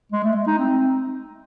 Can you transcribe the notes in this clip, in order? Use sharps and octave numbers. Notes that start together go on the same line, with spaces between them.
G#3
A3
G#3
D#4
C4